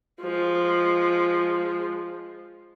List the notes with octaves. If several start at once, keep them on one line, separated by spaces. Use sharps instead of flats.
F3 G#3